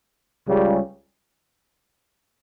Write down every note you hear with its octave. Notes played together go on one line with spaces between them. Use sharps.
C#2 C#3 G3